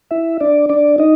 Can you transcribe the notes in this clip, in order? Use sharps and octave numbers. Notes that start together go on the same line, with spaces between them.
E4 E5
D4 D5
D4 D5
D#4 D#5